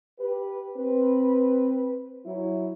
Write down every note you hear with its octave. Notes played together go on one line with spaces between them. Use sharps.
G4 B4
C4 B4
F#3 E4